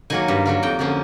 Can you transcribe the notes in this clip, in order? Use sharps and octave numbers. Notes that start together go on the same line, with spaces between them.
D#3 F#3 A#3 G#5
G2
D#3 F#3 A#3
F2 G5
D3 F3 A#3 C#4